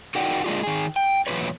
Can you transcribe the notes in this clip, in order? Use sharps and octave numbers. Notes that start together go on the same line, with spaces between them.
D#4 F#4 A#4 D5 F#5 G5
G#3 A#3 D4 F4 G4
D#3 G#4
G5
E2 A#2 F3 F#3 B4 C#5